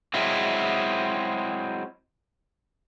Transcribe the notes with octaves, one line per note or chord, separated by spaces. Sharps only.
F#3 G#3 C4 E4